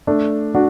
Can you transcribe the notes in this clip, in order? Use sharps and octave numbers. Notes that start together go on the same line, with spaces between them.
A3 D4
D4 F#4